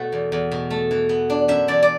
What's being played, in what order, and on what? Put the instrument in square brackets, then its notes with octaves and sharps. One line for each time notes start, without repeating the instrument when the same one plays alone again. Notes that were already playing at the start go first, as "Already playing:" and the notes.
Already playing: [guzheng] B2 A3 F#5
E2
E2
B2
A3
E3
B3
D4
F#2 E5
E3 D5
D5